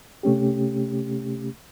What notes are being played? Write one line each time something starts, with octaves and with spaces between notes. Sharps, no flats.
C3 A3 C#4 G4